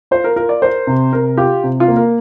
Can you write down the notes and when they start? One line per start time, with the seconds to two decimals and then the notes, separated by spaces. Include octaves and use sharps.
0.11 F4 C5
0.24 A#4
0.36 F4 A#4
0.49 D5
0.62 A#4 C5
0.87 C3
1.13 C3 A#4
1.37 F4 G4
1.64 C3
1.80 F4
1.88 A#3
1.96 A#4